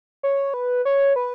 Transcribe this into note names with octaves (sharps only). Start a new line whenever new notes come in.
C#5
B4
C#5
B4